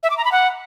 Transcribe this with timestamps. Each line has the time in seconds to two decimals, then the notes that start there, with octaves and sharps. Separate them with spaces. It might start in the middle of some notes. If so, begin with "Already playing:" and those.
0.03 E5
0.10 D6
0.17 A#5
0.25 B5
0.32 F#5